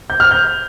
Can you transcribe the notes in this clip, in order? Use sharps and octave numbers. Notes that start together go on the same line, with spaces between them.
G6
F6
G6